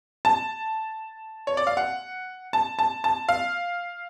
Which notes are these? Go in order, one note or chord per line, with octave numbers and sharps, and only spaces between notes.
A5
C#5
D5
F5
F#5
A5
A5
A5
F5